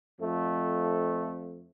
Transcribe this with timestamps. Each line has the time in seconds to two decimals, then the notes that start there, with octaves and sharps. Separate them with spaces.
0.20 F2 F3 A3